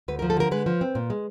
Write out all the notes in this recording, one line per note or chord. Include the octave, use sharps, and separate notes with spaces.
D2 B4
F3 A#4
A4
D3 A#4
G#3 B4
F3
C4
A#2
G#3